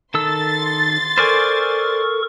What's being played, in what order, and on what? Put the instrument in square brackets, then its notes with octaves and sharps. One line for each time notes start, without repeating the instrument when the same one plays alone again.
[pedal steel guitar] D#3 A4 E6 [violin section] C6 A6
[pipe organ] A4 A#4 C#6 [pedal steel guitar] C5 D5 G#5